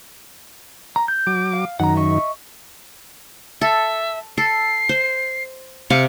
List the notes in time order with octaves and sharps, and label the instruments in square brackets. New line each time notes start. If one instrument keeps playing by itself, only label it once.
[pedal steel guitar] A#5
G6
[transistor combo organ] F#3 D6
[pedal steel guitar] F5
[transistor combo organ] F#2 D#3 [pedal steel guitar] F#5 A#5
[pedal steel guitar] D#5 E5 C#6
[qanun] A4 [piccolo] E5
[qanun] A4 [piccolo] C7
[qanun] C5
[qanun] C3 F5 D6 [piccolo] C#7